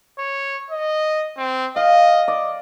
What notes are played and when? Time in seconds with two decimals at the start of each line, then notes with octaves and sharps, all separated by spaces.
0.18 C#5
0.71 D#5
1.37 C4
1.76 D#5 F5
2.28 D5 D#5